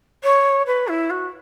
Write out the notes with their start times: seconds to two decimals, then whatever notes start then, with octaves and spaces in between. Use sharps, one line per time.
0.23 C#5
0.66 B4
0.88 E4
1.10 F#4